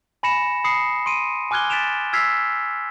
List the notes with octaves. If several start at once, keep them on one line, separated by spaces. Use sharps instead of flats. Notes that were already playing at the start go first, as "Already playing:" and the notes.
G#5 B5 A#6 C#7 E7
B5 D#6 C7 C#7
C6 D7 D#7
G#5 D6 F6 F#6 G#6 G7
A6 B6 D7 E7 F7
E6 F6 G#6 B6 C7 F7